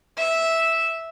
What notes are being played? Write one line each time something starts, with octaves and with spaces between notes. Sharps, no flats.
E5